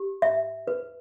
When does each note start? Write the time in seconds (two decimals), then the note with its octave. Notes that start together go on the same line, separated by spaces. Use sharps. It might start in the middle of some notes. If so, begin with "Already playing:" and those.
Already playing: G4
0.22 E5
0.67 B4